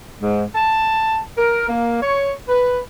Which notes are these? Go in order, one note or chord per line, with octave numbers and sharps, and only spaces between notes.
G#2
A5
A#4
A#3
C#5
B4